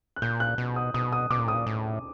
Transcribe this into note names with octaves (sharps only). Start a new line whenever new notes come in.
F#6
A#2 G6
F#6
B2
D#6
B2 D#6
D#6
B2 D6
A#2
A2 D#6
A#2
A2